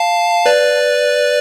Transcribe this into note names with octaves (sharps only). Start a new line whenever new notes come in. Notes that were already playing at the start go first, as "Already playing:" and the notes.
Already playing: F5 A5
B4 D5